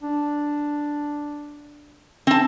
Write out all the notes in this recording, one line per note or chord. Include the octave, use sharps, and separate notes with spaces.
D4
C4 A5